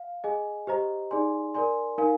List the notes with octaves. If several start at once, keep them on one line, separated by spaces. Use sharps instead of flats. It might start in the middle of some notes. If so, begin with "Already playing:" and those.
Already playing: F5
G#4 D#5 G#5
G4 C5 D#5 A#5
D#4 G#4 D5 G#5 C6
A#4 D5 G#5 C6
D#4 A#4 F5 G#5